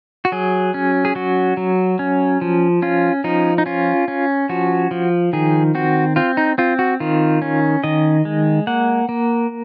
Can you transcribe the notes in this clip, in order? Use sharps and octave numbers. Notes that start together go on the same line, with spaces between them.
F#4
F#3 G#4
C#4
G#4
F#3 F#4
F#3
C#4
F3
C#4 F4
F3 D#4
D#4
C#4 F4
C#4
F3 F#4
F3
D#3 G#4
C4 F#4
C4 F4
D#4
C4 F4
F#4
D#3 F4
C#4
D#3 D#5
G#3
A#3 F#5
A#3